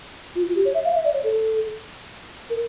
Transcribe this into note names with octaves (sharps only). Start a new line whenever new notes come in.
F4
F4
G4
C#5
E5
F5
E5
D5
C#5
A4
A#4